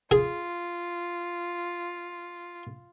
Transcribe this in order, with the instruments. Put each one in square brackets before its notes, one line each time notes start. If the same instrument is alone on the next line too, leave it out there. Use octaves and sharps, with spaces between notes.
[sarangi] F4 [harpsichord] G#4